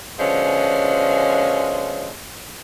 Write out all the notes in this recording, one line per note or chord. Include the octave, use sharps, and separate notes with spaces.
B2 D3 F3 G#3 C#4